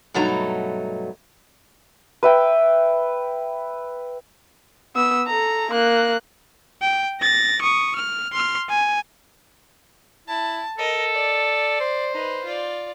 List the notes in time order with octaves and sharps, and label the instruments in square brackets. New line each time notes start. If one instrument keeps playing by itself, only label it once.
[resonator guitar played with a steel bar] G2 B2 F#3 A3 D#4 A#5
[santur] B4 E5 G5
[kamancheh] B3 E6
A4 A#5
A#3 F#6
[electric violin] G5
A6 A#6
C#6 D#6
F6
C6 F6
G#5
[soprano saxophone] E4 [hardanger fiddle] A5
[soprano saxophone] A4 [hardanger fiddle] A#4 D#5
[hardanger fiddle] D5
[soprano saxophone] C5
[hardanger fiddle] D#4 B4
F4 D5